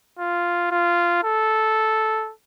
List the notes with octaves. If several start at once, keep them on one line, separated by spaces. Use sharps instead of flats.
F4
F4
A4